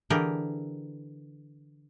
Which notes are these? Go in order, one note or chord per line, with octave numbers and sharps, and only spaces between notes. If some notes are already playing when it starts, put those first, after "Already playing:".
D3 E3 G4 G#4 A#4